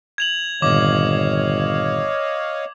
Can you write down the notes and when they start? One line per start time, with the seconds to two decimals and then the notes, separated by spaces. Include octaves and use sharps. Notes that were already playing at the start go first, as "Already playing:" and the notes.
0.18 G#6 F7 F#7
0.62 G1 A#2 D#3 C#5 D#5 F5 D6